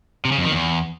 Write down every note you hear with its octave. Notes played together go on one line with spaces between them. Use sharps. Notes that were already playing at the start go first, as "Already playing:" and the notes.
C3
C#3
F2
D#3
E2